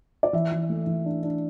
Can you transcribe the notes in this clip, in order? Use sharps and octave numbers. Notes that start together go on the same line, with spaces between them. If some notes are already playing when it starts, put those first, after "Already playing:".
D5
E3 E5
E3
A3
E3
D4
D4